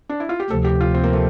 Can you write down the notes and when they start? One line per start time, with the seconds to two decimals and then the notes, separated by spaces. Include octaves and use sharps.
0.09 D4
0.20 E4
0.29 F4
0.40 G4
0.50 D2 C3 F3 A4
0.64 G4
0.81 F4
0.95 C4
1.04 A#3
1.13 A3